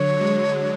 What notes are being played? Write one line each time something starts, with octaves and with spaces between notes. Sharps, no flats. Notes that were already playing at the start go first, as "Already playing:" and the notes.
Already playing: D3 F#3 C#5
G#3